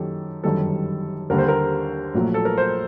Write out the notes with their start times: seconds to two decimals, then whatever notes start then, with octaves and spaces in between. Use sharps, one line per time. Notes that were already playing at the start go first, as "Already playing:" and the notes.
Already playing: F#2 D#3 F#3 G4 A4
0.44 G1 F#2 D#3 G3 A4
1.30 D#2 D3 G3 A#4
1.38 C5
1.48 A#4
2.14 A#1 A#2 F#3 A3
2.34 A4
2.45 A#4
2.58 C5